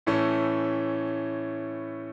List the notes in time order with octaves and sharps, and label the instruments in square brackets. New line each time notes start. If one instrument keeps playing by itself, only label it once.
[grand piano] A2 E3 A3 C#4